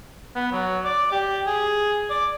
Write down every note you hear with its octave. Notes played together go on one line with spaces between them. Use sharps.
B3
F#3
D5
G4
G#4
D5